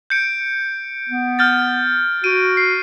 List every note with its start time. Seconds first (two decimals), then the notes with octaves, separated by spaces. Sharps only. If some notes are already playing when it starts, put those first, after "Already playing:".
0.10 G6 C#7 D7
1.09 B3
1.39 F6 G6 A6
2.24 F#4 D7 D#7
2.57 C7